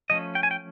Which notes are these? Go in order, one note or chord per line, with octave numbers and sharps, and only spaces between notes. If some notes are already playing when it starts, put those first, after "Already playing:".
F3 A3 C#4 D#5
G5
G#5
G5